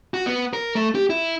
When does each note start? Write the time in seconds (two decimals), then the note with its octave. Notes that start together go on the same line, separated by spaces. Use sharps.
0.14 F#4
0.26 B3
0.53 A#4
0.75 A3
0.95 G4
1.10 E4